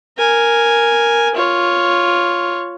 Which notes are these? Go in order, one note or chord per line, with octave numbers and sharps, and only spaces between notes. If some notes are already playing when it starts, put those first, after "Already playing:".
A#4 G#5
F4 C#5